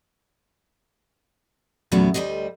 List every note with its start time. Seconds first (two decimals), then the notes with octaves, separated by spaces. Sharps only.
1.92 E2 A#2 C#3 F#3 A3 B3
2.14 D2 B2 G3 C5 D#5